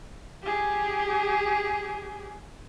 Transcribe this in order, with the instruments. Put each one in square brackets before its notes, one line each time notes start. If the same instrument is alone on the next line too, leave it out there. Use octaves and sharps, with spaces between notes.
[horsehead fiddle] G4 G#4